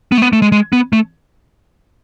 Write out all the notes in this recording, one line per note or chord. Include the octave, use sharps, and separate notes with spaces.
B3
A3
B3
A3
G#3
G#3
B3
A3